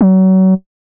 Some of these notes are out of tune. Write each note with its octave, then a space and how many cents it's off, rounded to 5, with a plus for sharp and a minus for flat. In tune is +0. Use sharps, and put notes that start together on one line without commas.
F#3 +30